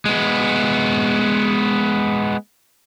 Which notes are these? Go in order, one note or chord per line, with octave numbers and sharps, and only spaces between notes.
G#3 B3